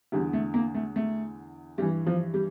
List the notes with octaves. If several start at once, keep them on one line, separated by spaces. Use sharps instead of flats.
E2 D3 G3
A3
A#3
A3
A3
G2 E3 G3
F3
G3